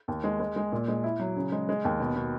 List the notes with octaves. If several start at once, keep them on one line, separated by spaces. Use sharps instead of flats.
D#2
G#3
G#3
G#3
A#2
G#3
E4
F#3
C#3
G#3
G#3
D#2
B2
B2